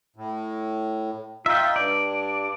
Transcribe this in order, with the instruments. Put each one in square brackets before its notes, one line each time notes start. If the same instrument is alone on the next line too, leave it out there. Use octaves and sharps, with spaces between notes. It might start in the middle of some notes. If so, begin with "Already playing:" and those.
[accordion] A2
[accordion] D#4 F4 [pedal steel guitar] E5 G5
[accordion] G2 [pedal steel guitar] D5